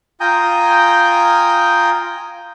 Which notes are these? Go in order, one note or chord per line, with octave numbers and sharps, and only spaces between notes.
F4 G5 G#5 A#5 D#6 G6